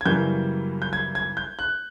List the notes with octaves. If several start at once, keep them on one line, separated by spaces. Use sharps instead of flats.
G#6
F#2 C#3 E3 G3 A#3 G6
G6
G#6
G#6
G6
F#6